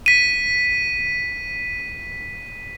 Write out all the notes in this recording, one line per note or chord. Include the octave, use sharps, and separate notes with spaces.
B6 D#7